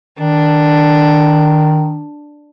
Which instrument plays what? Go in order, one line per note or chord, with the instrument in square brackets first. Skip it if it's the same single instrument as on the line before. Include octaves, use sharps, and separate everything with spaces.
[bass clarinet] D#3 [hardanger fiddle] D4